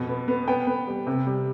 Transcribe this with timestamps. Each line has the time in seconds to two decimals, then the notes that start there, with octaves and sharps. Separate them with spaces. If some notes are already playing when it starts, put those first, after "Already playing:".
Already playing: F2 B2
0.08 B3
0.28 B3
0.48 B3 G5
0.67 B3
0.87 G3
1.07 C3
1.27 G3